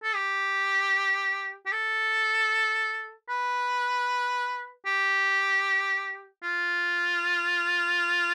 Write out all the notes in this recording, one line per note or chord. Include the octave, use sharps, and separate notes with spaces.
A4
G4
G4
A4
B4
G4
F4